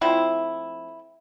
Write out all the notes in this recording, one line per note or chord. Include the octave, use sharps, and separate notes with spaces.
F3 A3 C4 E4